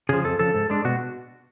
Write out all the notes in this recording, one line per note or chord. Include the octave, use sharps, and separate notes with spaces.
C#3 F3 G#4
F2 A4
C#3 F3 A4
G#2
G#3 D4
B2 F#4